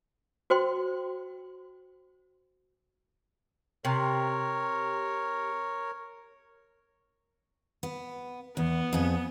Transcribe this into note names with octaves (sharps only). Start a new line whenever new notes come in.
F#4 C5 G5 C6
C3 A#4 C#5
B3
E2 B3
F2 G#4